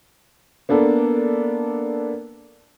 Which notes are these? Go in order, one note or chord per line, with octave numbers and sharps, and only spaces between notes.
A#3 B3 D4 A4